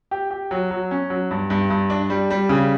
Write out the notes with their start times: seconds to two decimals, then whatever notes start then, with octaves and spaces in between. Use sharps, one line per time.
0.11 G4
0.30 G4
0.51 F#3
0.71 F#3
0.91 C#4
1.10 F#3
1.31 G2
1.50 G2
1.70 G2
1.90 D4
2.10 G3
2.30 G3
2.49 C#3